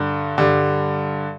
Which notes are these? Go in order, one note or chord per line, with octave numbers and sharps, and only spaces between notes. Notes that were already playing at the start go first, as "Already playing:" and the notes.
Already playing: G2 D3 G3
G2 D3 G3